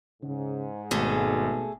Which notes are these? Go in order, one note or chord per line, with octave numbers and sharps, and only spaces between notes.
G#2 C#3
G#1 B2 A3 G#4 A4